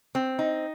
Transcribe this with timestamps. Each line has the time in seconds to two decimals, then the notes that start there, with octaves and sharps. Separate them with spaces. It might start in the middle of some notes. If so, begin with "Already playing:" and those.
0.15 C4
0.39 D#4